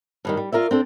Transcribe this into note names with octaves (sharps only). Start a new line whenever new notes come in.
G2 D#3 G3
G3
F4 A#4 D5 E5
C4 D4 A4